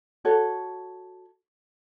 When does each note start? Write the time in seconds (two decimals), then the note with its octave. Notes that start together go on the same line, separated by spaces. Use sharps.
0.25 F#4 A4 C#5